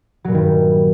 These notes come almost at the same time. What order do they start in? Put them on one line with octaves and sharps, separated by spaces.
F#3 A#2 G2 D#3 G3